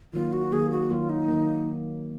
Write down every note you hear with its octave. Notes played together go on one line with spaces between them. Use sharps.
D#3 F#3 A#3 F4
F#4
D#3 F#3 A#3 G#4
F#4
D#3 F#3 A#3 F4
D#4
D#3 F#3 A#3